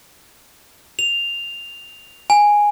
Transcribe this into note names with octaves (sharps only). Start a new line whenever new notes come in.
F7
G#5